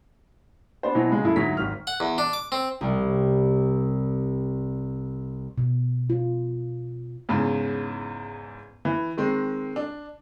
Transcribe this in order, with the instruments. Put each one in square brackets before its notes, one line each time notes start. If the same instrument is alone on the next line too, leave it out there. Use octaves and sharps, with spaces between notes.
[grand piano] B3 D4 C5
B2 E3 F#3
C#3 G#3
F#2 E4 A4
D2 G#2 F#3 B6
G#1 D#3 F6
[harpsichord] F#5
E2
D4
D6
C4
[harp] C2 G3
[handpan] B2
F4
[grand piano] E2 G#2 C#3
E3
D#3 G#3 C4
D4